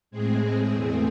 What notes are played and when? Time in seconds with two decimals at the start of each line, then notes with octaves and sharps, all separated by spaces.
0.11 A2 G#3 C4 G#4
0.71 E2 B2 A3 C4